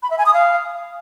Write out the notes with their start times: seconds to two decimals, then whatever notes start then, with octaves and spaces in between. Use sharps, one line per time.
0.03 B5
0.11 E5
0.18 G#5
0.26 D#6
0.34 F5